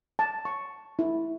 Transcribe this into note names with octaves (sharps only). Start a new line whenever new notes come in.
A5
C#6
E4